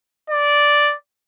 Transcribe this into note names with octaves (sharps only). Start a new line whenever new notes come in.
D5